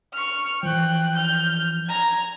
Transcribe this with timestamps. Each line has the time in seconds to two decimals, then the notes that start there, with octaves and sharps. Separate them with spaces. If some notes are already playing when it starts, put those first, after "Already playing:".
0.14 C#6 F6
0.63 E3 F3 G5 F#6
1.15 F6 G6
1.87 A#5 G#6